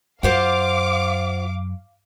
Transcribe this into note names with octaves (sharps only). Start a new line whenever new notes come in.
F#2 F4 C5 F5 F#5 D6